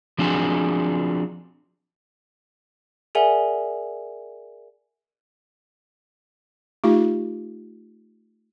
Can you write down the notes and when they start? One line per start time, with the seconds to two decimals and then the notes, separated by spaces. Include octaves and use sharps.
0.18 F3 C4 D4 F#4 G#4
3.15 G#4 A#4 D5 E5 F#5 G#5
6.84 A3 D#4 F4 G4